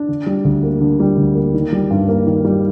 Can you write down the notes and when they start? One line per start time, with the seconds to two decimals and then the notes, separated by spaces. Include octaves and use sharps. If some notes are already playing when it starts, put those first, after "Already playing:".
Already playing: D4
0.08 D3
0.27 G3
0.45 D2
0.63 A#3
0.81 D3
1.00 G3
1.17 D2
1.35 A#3
1.54 D#3
1.72 G3
1.91 G2
2.08 A#3
2.26 D#3
2.45 G3